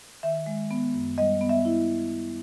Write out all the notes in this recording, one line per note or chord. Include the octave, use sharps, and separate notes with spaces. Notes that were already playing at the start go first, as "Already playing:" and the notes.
D#3 E5
G#3
B3
F#2
G3 D#5
B3
E5
E4